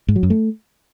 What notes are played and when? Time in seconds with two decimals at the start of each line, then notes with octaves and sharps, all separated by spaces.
0.08 G#2
0.16 F#3
0.23 F#2
0.30 A3